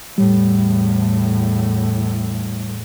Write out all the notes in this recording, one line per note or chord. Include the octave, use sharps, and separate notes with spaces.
E2 A2 G3